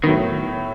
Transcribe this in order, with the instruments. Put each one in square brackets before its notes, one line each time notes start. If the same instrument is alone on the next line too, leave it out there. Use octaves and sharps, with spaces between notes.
[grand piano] A2 F#3 B3 [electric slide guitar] D#3